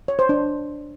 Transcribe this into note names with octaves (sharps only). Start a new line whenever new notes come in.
C#5
C5
D4